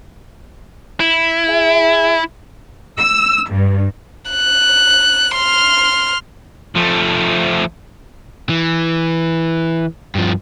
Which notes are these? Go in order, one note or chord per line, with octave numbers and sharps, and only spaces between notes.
E4
G#4 E5
E6
G2
F#6
C6 F6
F3 A3
E3
G2 F3